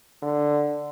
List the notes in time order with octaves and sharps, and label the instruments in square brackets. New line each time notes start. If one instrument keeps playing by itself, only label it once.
[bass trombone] D3